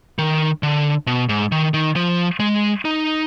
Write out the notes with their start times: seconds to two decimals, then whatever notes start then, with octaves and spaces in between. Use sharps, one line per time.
0.18 D#3
0.63 D3
1.07 B2
1.29 G#2
1.52 D#3
1.74 D#3
1.96 F3
2.40 G#3
2.85 D#4